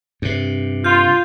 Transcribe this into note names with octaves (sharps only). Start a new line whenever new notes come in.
G2 C3
F4 G6